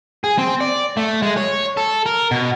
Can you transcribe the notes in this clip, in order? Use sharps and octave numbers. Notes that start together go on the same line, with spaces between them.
G#4
C4
D5
A3
G#3
C#5
A4
A#4
B2